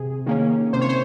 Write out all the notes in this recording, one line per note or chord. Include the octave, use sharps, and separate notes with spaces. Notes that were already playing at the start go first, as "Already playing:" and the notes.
Already playing: C3 G#4
D#3 A#3 C#4
C3 C5
C#5
C5